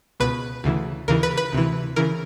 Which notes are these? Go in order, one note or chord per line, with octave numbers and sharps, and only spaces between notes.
C#2 B2 B4
D2 C#3 E3
D#2 C#3 E3 A#4
B4
B4
D2 C3 E3
C#3 E3 A#4